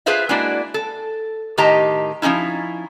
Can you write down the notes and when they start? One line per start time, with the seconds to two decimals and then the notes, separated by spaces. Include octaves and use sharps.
0.06 F4 G#4 B4 C5 E5 F5
0.29 G#3 A#3 D4 E4 F#4 D5
0.74 A4
1.58 A2 D#3 G4 D#5 A5 A#5
2.22 F3 C4 C#4 D#4 E4